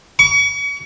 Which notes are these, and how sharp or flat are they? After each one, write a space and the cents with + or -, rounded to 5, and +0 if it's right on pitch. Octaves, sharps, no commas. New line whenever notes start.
C#6 +35